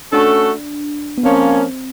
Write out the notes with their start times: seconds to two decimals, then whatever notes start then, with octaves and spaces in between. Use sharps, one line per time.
0.12 A3 C#4 D4 F#4 A4
1.18 B3
1.23 F3 A#3 C4 C#4